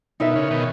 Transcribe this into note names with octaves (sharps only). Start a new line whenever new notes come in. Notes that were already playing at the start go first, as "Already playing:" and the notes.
B2 D#4 A#4 E5
C#3
B2 D#3